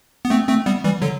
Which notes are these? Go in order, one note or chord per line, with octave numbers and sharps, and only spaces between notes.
B3
A3 C4
A3 C4
G3 B3
E3 G3
D3 F#3